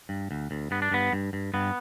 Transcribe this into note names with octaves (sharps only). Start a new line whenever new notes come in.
G2
D2
D2
G2 B3
D4
G2 B3
G2
G2
G2 B3